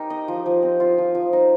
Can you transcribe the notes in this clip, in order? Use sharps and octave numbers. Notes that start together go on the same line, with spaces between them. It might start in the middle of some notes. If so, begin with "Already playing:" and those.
Already playing: D#4 G4 A#4
D#5
F3
F3
C4
F4
F3
F3
D#4